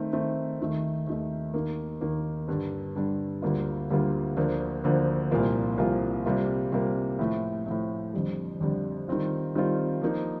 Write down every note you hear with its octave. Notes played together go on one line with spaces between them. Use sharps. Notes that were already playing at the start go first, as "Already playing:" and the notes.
Already playing: D#3 A3 C4
D#3 A3 C4
D#2 D#3 A3
D#2 D#3 A3
D#2 D#3 A#3
D#2 D#3 A#3
G2 D3 G3 D4
G2 D3 G3 D4
D2 D3 G3 A#3 F4
D2 D3 G3 A#3 F4
D2 D3 F3 A#3
D2 D3 F3 A#3
C2 A#2 F3 A#3 F4
C2 A#2 F3 A#3 F4
C3 G3 A#3 F4
C3 G3 A#3 F4
A2 F3 A3
A2 F3 A3
F2 D3 G3
F2 D3 G3
D#3 G3 C4 F4
D#3 G3 C4 F4
F3 A#3 D#4